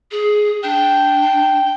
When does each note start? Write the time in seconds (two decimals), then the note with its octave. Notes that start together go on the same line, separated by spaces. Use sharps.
0.11 G#4
0.63 D4 G5